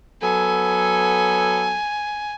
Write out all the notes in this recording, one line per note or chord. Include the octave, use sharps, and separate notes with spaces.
F#3 B3 A4 G#5